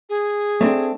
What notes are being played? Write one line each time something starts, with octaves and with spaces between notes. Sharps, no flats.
G#4
A3 C4 D4